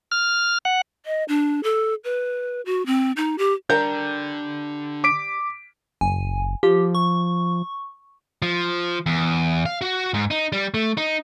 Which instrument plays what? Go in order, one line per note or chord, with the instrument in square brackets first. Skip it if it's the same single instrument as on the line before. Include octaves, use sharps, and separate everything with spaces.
[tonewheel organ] F6
F#5
[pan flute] D#5
D4
A4
B4
F#4
C4
D#4
G4
[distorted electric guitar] D3 [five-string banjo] G3 A#4 A#5 [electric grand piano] G6
[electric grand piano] D6 B6 D7
[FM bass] F#1 [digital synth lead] G#5
[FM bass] F3 [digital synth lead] G4
[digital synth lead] C#6
[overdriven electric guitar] F3
E2
F5
F#4
G#2
D#4
G3
A3
D#4